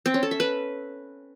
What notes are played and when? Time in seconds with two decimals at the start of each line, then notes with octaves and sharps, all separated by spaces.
0.06 C4
0.14 C#4
0.23 A4
0.31 E5
0.40 B4